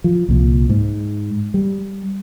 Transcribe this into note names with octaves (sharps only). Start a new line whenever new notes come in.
F3
C2 A#2
G#2
G3